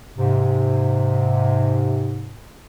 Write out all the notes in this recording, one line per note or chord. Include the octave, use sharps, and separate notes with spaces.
G#2 C3